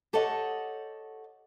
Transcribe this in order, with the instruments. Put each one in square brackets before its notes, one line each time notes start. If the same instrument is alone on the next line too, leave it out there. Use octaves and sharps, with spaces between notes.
[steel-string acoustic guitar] G4 A4 C#5 D#5 F#5